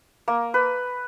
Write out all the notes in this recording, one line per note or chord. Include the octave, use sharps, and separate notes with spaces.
A#3
B4